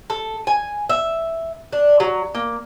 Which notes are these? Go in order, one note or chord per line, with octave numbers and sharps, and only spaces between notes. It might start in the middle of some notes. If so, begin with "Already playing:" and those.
A4
G#5
E5
D4
F#3
A#3